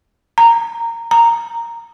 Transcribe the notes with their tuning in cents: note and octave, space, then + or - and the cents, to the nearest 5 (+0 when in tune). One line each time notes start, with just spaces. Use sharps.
A#5 -15
A#5 -5